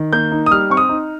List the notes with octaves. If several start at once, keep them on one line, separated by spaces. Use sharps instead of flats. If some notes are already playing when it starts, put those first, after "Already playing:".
Already playing: D#3
A#3 G6
D#4
D#6
G3 F6
C4 C#6
D#6
D#4